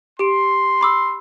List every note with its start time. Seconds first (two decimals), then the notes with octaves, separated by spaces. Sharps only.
0.19 G4 C6 D7
0.81 B5 D6 E6